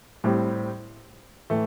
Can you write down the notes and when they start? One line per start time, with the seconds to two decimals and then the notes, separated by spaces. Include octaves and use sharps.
0.24 A2 G3 C4 G4
1.50 A2 E3 A3